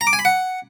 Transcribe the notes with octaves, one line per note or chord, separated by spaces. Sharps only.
A#5
D6
G#5
B5
F#5